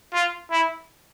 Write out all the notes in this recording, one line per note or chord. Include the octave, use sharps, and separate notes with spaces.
F4
E4